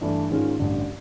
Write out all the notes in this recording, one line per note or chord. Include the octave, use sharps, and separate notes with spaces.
G2 E3 A3 D4
G#2 D#3 G#3 C#4 F4
A1 G2 D3